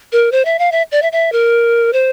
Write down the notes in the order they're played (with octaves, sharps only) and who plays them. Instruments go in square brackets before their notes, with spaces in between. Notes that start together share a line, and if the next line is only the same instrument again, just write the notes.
[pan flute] A#4
C5
E5
F5
E5
D5
E5
E5
A#4
C5